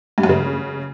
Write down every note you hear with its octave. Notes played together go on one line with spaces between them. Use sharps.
G2
F#2
C#3